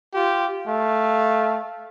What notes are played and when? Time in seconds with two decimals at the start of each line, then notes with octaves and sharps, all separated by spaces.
0.14 F4 G4
0.66 A3 F5